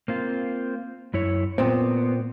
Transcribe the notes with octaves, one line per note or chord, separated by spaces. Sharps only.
A#3 C4 F4
F#2 E4 C#5
A#2 B3 C4